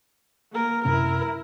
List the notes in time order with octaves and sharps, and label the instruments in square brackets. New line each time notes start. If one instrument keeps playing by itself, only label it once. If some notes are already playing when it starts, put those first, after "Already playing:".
[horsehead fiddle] A#3 A#4
[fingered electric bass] F#2 C3 C#4 [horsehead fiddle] E4 A#4